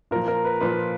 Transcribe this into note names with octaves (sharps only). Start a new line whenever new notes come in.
A#2 F3 A#4
A#4
B4
A#2 F3 B4